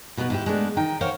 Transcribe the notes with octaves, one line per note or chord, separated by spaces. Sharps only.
B2 B3 D#4 F#4 B4
G#2 E4 G4
G#3 A3 B3 D4
D#3 D#4 G5
A#4 C5 C#5 F5 F#5